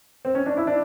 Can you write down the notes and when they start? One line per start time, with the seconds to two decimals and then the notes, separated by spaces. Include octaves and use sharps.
0.25 C4
0.35 C#4
0.46 D4
0.57 E4
0.67 D4